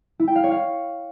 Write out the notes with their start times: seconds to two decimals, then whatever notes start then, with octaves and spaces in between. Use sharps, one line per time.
0.20 E4
0.28 G5
0.36 F5
0.44 C#5
0.52 F5